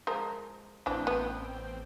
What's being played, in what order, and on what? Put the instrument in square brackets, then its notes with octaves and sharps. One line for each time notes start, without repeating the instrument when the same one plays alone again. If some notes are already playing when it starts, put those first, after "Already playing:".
[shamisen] F3 G#3 A#4
[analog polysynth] A1 C4 G5 [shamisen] E3 D4
[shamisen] B3